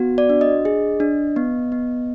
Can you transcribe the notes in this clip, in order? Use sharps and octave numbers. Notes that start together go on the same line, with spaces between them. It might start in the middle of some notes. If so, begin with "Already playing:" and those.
Already playing: B3 F#4
D5
D4
D#5
G#4
D4
B3
B3